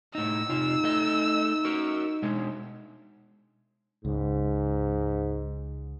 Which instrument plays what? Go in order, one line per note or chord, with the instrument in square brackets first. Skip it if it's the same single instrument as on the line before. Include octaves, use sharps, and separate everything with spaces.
[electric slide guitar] A2 D#4 [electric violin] E6
[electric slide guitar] C3 F4 [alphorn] D#4
[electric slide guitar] A3 D#5
F#4 A#4
B2 G#3
[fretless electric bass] C#2 [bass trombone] G#2